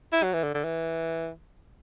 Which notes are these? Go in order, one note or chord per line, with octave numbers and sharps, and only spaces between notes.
E4
F#3
E3
D3
D3
E3